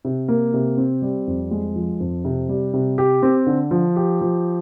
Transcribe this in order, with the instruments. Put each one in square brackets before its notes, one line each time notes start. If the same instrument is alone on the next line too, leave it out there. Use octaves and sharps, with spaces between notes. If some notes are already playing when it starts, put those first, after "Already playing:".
[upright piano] C3
A#3
C3
C4
G3
F2
G#3
F3
F2
C3
G3
C3
G4
C4
D3
F3
G4
F3